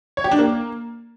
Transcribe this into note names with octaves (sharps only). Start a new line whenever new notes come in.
C#5
G4
D4
A#3